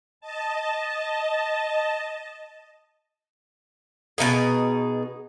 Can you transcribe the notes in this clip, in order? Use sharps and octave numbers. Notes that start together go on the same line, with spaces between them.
D#5 A5
B2 D#3 D#4 G#4